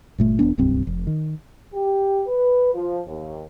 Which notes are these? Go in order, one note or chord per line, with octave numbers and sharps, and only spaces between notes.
G1 A#2 A3
E1 F#2 B3 D4
D1 C2 G2 C4
F1
D#3
G4
B4
F3
D#2